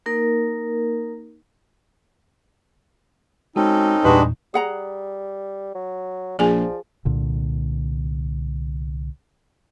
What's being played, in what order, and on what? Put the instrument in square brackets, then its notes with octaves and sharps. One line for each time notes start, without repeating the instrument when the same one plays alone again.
[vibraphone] A#3 D#4 A#4
[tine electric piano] G#3 F#4 [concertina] C4 C#4 A4 [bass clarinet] D#4
[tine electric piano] E2 A#2 [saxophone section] G2 G#3 B4 [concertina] D4 F#4 G4
[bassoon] G3 [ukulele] G#4 F#5 A#5
[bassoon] F#3
[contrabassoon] A#1 [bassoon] F3 [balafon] G#4 G#5 [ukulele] D5
[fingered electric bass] C2 A#2 D3